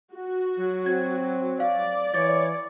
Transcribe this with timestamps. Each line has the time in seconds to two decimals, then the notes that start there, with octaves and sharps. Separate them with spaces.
0.14 F#4
0.57 F#3
0.86 C4 G#6
1.60 D5 F5
2.14 E3 C#5 D6 A6